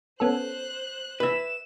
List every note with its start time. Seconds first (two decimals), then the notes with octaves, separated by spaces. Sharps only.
0.20 B3 C#4 A4 C5 F#6
1.20 B4 E5 E7